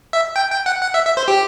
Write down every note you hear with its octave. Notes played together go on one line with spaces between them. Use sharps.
E5
G5
G5
F#5
F#5
E5
E5
C5
G4